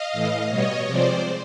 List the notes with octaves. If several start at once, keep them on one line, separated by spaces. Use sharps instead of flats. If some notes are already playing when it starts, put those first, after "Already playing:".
Already playing: D#5 F5
A2 E3 A3
B2 G3 B3 C#5 D#5
C3 F3 G#3 C4 C5 D5